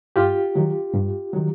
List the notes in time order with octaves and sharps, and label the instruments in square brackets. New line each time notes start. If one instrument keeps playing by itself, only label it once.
[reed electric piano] G2 F4 G4
D#3 F#3
G2
D#3 F#3